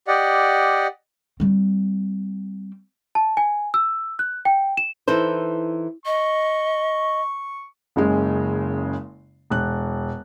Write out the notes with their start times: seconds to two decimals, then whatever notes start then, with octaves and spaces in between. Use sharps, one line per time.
0.08 G4 D5 D#5 F#5
1.40 G3 C4
3.15 A5
3.37 G#5
3.74 E6
4.19 F#6
4.45 G5
4.77 E7
5.08 E3 D#4 A4 C5
6.06 D#5 C#6
7.96 F#1 C#3 G#3
9.50 E1 F#6